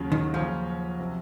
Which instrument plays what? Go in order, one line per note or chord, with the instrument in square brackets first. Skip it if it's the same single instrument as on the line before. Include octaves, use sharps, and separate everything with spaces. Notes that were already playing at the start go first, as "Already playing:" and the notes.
Already playing: [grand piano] D#2 C#3 F#3 C#4 F4
[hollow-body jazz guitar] D#3
[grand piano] D#2 C#3 F#3 C#4 F4 [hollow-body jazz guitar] F3
[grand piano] C3 F#3 C4